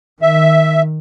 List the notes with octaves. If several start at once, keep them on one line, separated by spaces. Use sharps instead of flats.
D#3 E5